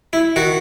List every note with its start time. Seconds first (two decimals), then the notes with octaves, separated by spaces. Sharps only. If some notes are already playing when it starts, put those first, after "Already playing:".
0.13 E4
0.36 D#3 F#4